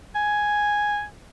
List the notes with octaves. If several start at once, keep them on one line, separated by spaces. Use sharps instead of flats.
G#5